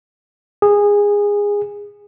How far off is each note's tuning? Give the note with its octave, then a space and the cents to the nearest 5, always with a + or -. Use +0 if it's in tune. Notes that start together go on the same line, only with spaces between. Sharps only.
G#4 -20